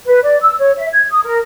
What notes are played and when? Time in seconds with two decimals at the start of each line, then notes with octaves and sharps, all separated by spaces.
0.07 B4
0.23 D5
0.42 E6
0.59 C#5
0.78 E5
0.93 G#6
1.11 D#6
1.24 A#4